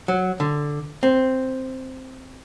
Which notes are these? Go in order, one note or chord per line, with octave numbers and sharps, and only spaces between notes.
F#3
D3
C4